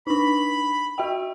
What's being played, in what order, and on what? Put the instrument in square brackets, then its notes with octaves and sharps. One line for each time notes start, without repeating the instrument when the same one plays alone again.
[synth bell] D4 D#4 [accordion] B5
[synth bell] F#4 E5 G5